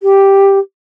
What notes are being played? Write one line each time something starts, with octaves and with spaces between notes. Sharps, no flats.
G4